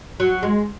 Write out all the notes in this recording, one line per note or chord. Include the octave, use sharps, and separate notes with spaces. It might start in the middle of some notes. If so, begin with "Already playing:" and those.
F#3
G#3